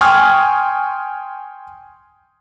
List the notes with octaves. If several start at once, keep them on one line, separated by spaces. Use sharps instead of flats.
G5 G#5 C6 C#6 D#6 F6